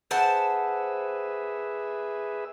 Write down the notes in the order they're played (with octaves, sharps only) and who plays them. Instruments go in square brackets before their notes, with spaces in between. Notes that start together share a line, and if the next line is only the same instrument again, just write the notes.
[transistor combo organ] G#4 B4 E5 [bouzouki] C5 F#5 A5